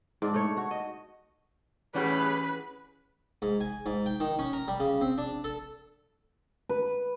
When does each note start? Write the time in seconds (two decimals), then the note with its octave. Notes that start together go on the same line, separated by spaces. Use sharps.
0.22 G#2 D4
0.34 A3 C#5
0.57 F#4
0.71 D#5
1.95 A2 E3 G3 C#4 G#4 B4 F#5
3.42 G#2
3.61 G#5
3.86 G#2
4.06 G5
4.20 D#3
4.39 C#4
4.53 A#4
4.68 G3
4.80 C#3
5.01 C4
5.18 D4
5.44 A4
6.69 B4